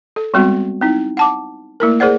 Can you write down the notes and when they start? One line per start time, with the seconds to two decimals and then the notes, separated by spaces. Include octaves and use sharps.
0.16 A4
0.34 G3 G#3 B3 C4 F#4
0.81 C4 D#4 E4
1.17 F#5 A5 D6
1.80 A3 A#3 E4 A#4
2.00 G#4 A#4 C5 D5 F#5